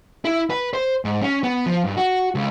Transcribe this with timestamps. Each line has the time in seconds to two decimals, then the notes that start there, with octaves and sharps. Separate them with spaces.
0.25 E4
0.50 B4
0.73 C5
1.05 G#2
1.22 C#4
1.43 B3
1.66 F3
1.84 G2
1.97 F#4
2.35 C#2